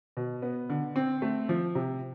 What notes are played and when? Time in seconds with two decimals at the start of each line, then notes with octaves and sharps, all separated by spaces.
0.17 B2
0.42 B3
0.69 D3
0.96 C4
1.22 A3
1.49 F3
1.75 C3